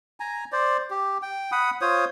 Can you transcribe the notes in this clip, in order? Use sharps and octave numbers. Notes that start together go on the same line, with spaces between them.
G#5 A#5
C5 D5
G4
G5
F#5 B5 D#6
F4 C5 C#5 D#6